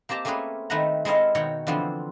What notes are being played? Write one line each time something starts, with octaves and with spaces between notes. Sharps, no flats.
A#3 C4 G4 A5 A#5
A3 A#3 C4 C#4 G#4 B4
D#3 A3 C4 B4 F#5 A#5
G#3 C4 E4 A4 D#5 F5
B2 D#3 F#4 C#5 F#5 G5
D3 E3 F3 B3 C4